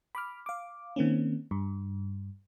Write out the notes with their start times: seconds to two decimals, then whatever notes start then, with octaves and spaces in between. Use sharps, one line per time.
0.15 B5 D6 F6
0.46 F5 D6
0.96 D#3 A#3 C4 C#4
1.51 G2